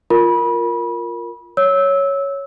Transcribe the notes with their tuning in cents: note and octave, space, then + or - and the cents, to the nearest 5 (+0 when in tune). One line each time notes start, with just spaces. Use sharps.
F4 +0 A#4 +0 B5 -30
C#5 +0 E6 -15